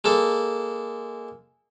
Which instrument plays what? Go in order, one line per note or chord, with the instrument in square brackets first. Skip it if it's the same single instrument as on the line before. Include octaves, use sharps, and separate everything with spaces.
[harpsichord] G#3 A#3 A4